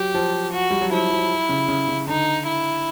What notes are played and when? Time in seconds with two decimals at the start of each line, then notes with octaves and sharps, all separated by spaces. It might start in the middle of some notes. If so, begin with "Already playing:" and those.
Already playing: F#3 G4
0.15 F3
0.53 F#4
0.71 G3
0.81 F#3
0.91 F3 E4
1.11 F3
1.49 C#3
1.68 C#3
1.88 C#3
2.07 D3 D#4
2.46 E4